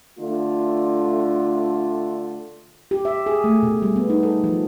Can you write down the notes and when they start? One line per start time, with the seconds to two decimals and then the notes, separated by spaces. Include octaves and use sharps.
0.19 D3 A3 D4 F4
2.91 G4
3.05 E5
3.26 G#4
3.44 A3
3.63 B2
3.82 G3
3.96 B3
4.10 D#4
4.23 A4
4.44 F3